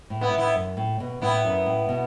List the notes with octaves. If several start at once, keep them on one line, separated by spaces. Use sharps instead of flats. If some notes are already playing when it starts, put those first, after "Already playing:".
A2
B3 E4
A2
B3 E4
F#2
A2
B2
A2 B3 E4
F#2
A2
B2